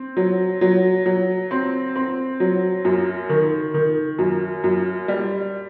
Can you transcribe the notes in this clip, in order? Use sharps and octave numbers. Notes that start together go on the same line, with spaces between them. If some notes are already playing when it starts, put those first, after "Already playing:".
Already playing: C4
F#3
F#3
F#3
C4
C4
F#3
F#2
D#3
D#3
F#2
F#2
G3